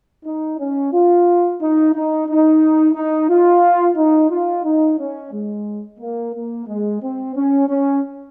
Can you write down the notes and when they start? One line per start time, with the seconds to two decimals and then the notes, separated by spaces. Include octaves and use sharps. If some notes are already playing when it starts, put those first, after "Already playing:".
0.24 D#4
0.59 C#4
0.92 F4
1.60 D#4
1.94 D#4
2.28 D#4
2.94 D#4
3.29 F4
3.96 D#4
4.31 F4
4.64 D#4
4.98 C#4
5.31 G#3
5.99 A#3
6.33 A#3
6.67 G#3
7.01 C4
7.35 C#4
7.68 C#4